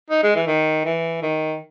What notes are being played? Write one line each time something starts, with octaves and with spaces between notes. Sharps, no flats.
D#4
G#3
E3
D#3
E3
D#3